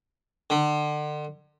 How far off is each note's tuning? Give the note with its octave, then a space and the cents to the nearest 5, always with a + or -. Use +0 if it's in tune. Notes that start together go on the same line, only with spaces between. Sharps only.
D3 +35